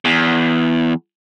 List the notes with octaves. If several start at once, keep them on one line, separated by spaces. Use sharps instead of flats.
E2